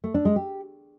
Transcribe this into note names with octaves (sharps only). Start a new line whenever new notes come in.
A3
D4
G#3
G4